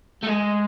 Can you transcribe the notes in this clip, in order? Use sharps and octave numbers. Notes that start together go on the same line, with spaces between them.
A3
G#3